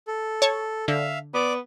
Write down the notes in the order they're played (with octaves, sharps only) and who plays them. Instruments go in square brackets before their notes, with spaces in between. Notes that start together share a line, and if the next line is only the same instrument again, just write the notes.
[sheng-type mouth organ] A4
[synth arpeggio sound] C#5 A5 C#6
[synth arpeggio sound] D3 [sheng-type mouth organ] E5 F5
[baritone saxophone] B3 [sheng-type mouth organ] D5 D6